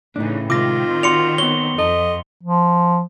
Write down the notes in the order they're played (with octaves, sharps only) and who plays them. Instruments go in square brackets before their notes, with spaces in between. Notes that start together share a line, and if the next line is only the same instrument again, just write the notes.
[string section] A2 C#3 E3 [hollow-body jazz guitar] D4 D#4
[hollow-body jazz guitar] C3 G#3 [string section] D#3 C4 [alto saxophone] F4 [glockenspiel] D6 A#6
[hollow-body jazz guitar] F#4 D5 [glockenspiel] C6 C#7 F7
[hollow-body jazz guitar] B3 F#4 C#5 [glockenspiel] G7
[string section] F2 [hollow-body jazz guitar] A4 [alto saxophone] D#5
[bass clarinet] F3